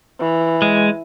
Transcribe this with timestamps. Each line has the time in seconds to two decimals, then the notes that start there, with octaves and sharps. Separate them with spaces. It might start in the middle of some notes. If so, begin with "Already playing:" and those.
0.20 E3
0.62 G#3